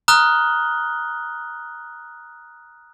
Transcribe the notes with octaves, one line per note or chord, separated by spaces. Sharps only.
A#5 D#6 F6 F#6 G7